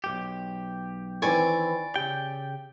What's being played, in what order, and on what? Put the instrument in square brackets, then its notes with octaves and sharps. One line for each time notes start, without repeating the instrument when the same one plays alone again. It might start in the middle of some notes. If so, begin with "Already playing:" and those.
[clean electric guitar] B1 G2 G4
[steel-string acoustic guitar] D#3 E3 C4 [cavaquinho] D5 G#5 C#6
[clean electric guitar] C#3 G5 [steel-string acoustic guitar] G4